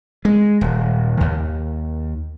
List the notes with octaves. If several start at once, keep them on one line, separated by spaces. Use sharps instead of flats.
G#3
D#1
D#2